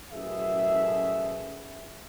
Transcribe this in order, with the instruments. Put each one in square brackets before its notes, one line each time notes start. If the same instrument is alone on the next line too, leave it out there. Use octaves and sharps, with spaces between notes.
[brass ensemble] A1 F#2 B2 G#4 E5